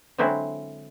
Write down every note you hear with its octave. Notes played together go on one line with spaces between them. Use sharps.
D3 F#3 G#3 C4 E4